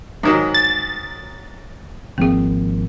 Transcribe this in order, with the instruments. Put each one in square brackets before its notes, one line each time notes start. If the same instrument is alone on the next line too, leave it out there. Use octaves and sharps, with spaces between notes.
[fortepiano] G#2 D#3 F#3
[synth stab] A6
[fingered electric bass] G#1 F3 A#3 [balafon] C4 G#4